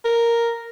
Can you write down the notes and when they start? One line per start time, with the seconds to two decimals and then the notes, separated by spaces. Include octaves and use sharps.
0.05 A#4